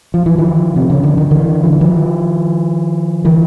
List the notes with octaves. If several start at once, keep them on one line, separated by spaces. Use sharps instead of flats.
F3
E3
D#3 F3
C3
C#3
D3
D#3
D3 E3
F3
E3
D#3 F3
D3 E3